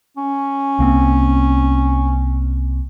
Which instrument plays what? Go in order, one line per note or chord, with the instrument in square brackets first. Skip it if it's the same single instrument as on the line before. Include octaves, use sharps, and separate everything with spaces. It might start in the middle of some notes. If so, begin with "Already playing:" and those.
[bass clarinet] C#4
[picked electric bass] C2 A#3 C4